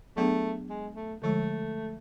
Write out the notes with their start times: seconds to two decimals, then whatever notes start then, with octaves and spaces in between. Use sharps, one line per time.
0.17 F#3 A3 B3 D4 G#4
0.69 G#3
0.96 A3
1.22 D3 F3 G#3 A3